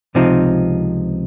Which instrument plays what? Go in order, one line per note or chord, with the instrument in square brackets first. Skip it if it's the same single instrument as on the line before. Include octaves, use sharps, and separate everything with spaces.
[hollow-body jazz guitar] C#2 C3 F3 C4 D#4